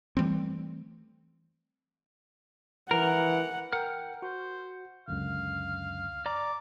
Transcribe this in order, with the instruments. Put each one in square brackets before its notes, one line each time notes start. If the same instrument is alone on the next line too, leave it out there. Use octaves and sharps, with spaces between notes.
[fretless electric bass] E3 G3 A3 C4
[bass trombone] E3 [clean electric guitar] A#4 [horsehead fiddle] F#5
[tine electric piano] A#4 G5 [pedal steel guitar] F#5 F6
[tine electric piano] F#4 [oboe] C5
[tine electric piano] C#2 F#2 D3 [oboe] F5
[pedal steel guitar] D5 A#5 [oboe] D6